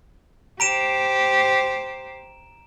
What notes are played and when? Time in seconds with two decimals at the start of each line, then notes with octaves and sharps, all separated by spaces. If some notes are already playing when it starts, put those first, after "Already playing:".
0.60 G4 C5 A#5 D7 E7